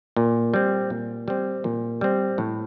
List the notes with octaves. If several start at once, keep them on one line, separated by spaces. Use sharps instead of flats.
A#2
G3 C4
A#2
G3 C4
A#2
G3 C4
A2